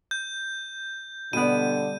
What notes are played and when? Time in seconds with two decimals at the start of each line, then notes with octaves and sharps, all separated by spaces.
0.11 G6
1.33 B2 D3 G3 B3 D5 D#7